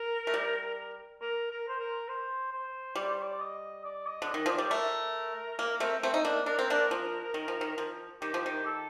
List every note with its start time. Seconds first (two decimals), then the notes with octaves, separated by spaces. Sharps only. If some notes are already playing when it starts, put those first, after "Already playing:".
Already playing: A#4
0.27 A3
0.34 G3
1.21 A#4
1.51 A#4
1.68 C5
1.80 A#4
2.09 C5
2.52 C5
2.96 G3 D5
3.10 C5
3.23 D5
3.40 D#5
3.84 D5
4.06 D#5
4.22 D3
4.28 D#5
4.34 D#3
4.46 F3 D5
4.58 G3
4.71 A3 A#4
5.59 A#3
5.80 A3 C4
6.03 A3 C4
6.14 D#4
6.25 A#3 D4
6.46 D4 A#4
6.59 C4
6.70 A#3 D4
6.91 F3
7.34 D#3
7.48 F3
7.61 D#3
7.78 F3
8.22 D#3 G4
8.34 F3
8.46 D#3
8.66 A4